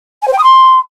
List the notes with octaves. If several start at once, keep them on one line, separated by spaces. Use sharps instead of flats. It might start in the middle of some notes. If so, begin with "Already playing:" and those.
G#5
C5
G5
D#6
C6